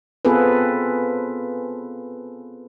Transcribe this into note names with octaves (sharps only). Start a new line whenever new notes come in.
B3 C4 F4 G#4 A4 B4